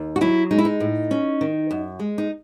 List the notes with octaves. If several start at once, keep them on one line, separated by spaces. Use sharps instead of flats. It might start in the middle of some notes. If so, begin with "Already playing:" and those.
Already playing: D#2
F#4
F#3 E4
G#3 D#4
E4
D#4
A2
C#4
D#3
F#2
G#3
D#4